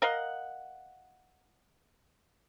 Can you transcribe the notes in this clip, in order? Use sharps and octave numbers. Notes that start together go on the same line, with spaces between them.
A#4 D#5 F5 F#5